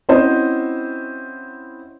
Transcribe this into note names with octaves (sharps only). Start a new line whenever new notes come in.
C4 C#4 E4 F#4 C5 D#5